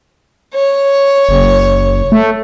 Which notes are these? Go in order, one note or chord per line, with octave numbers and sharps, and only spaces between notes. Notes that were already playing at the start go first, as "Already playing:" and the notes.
C#5
F#1
A3